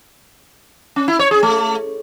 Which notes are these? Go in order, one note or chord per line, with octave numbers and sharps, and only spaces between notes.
C#4
E4
C#5
G#4
A3